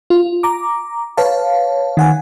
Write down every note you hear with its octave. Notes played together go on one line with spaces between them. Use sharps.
F4
A#5 D6
B4 C#5 F5 A5
D#3 F#5 G#5